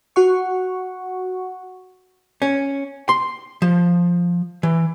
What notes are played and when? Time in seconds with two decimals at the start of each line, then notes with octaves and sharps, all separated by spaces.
0.16 F#4 F#5 C#6
2.42 C#4
3.09 C6
3.62 F3
4.63 E3